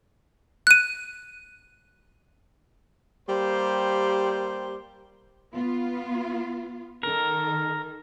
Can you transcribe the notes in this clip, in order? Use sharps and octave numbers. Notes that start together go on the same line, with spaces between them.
F#6 D#7
G3 A#3 G4 C5
B3 F4
D#3 A4 A#4